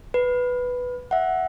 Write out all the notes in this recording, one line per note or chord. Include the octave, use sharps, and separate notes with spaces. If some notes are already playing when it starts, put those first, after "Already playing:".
B4
E5 F#5